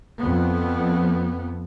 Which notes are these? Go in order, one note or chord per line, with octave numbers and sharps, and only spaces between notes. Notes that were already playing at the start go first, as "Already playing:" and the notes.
F2 B3